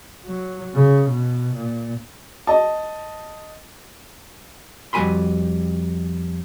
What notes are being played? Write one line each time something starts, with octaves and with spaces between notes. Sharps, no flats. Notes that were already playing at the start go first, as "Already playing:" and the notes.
F#3
C#3
B2
A#2
D#5 A5
F2 G3 F#4 G#5 B5 C6